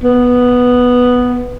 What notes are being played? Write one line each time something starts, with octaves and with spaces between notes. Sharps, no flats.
B3